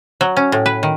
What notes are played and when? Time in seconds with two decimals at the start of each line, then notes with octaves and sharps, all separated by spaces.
0.21 F#3
0.37 C#4
0.52 A2
0.66 B4
0.83 D#3